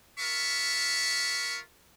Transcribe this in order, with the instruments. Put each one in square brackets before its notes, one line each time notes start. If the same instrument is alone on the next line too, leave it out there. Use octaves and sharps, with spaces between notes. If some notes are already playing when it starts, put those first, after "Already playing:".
[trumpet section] F4 A#4 E5 C#6